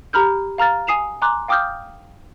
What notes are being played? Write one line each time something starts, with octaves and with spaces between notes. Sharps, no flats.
G4 A#5 B5 F6 G6
F5 A#5 F6 A6
G#5 D#6 C7 E7 F7
G#5 A#5 C6 D6 F#6
F5 G5 D6 D#6 F6 G6